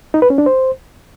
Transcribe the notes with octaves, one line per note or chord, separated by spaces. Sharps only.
D#4
B4
C#4
D4
C5